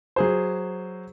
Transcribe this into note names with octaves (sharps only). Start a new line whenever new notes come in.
F#3 G#4 C5